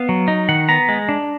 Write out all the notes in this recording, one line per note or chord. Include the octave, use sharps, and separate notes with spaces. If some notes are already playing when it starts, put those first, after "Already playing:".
Already playing: B3 F5
F#3
D#4
D#3 F#5
B3 A#5
G#3
D4